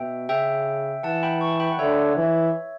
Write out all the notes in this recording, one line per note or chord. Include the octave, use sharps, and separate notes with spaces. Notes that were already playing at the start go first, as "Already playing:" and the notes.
Already playing: B2 E5 G5
C#3 E5 G5
E3 F#5 A5
G5 B5
A5 C#6
G5 B5
F#5
D3 C#5 E5
E3